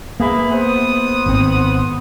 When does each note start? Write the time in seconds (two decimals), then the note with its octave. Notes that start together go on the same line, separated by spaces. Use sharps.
0.20 A#3 G#4 B4 E5
0.51 B3 C5 D#6
1.26 G#1 C4